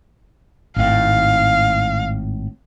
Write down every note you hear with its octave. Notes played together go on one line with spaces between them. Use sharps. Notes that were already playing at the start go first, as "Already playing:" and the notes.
G#1 A2 F5